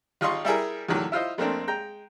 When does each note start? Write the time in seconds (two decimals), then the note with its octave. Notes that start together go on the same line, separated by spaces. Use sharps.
0.21 G#1 F4 D#5 C6 C#6
0.45 G3 E4 G#4 A#4
0.88 E2 A2 D3 D#3 F#3
1.12 E4 F4 C5 D#5
1.38 F2 A3 A#3 C4 D4
1.68 G#3 G5 A#5